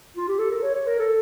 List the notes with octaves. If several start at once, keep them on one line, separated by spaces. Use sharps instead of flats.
F4
G4
A4
A#4
C#5
C#5
A#4
A4